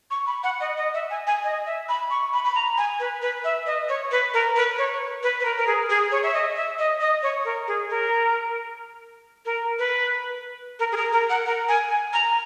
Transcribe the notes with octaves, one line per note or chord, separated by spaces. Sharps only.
C#6
B5
F#5
D#5
D#5
E5
G#5
G#5
D#5
E5
B5
C#6
B5
B5
A#5
G#5
B4
B4
E5
D#5
C#5
B4
A#4
B4
C#5
B4
B4
A#4
A#4
G#4
G#4
C#5
E5
D#5
E5
D#5
D#5
C#5
A#4
G#4
A#4
A#4
B4
A#4
G#4
A#4
A#4
F#5
A#4
G#5
G#5
A#5